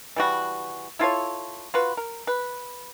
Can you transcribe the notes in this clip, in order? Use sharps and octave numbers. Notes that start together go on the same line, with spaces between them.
E3 G3 F#4
E4 F4 A4 C#5
F4 F#4 B4
A#4
B4